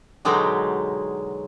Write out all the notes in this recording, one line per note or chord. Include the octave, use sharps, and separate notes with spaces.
B2 D3 F#3 G#3 D#4 G4